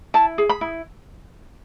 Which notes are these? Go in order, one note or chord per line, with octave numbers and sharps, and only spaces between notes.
E4 A5
G#4
B5
E4